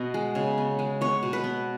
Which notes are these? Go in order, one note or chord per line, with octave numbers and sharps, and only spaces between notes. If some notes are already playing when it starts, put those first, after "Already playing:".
Already playing: B2 B3 D#5
G#3
C#3
B3
G#3
B3 C#5
B2
B4
B3